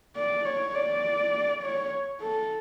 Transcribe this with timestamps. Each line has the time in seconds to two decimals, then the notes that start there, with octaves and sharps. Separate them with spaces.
0.16 D5
0.45 C#5
0.75 D5
1.63 C#5
2.21 A4